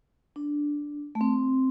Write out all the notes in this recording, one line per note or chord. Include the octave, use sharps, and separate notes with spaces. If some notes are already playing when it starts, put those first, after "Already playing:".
D4
A3
C4